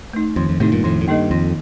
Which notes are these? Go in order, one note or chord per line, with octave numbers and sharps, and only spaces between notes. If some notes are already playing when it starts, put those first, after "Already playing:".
A3 D#4
F2 D#3
F2
A2 C3 A3 D#4
G2 A#2
F2 A2 D#3
A2
G2 A#3 D#4 A4 D#5
F2 D#3